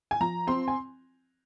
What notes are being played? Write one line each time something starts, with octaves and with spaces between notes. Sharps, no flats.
G#5
F3 A#5
C4 C6
G#5